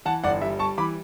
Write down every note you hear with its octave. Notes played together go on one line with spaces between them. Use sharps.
E3 F#5 A5
G1 D5 F#5
G3 E5
G3 A5 C#6
E3 B5 D6